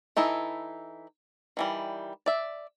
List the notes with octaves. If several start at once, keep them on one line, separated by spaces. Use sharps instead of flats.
E3 D#4 E4 A4
D#3 E3 G3
D5 E5